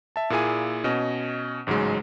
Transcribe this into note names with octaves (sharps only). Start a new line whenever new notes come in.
E5 A5
A#2 A#3 E4 G#4 G#5 D#7
B2 C#4 D#5
A1 G#2 C#3 F#3 G#3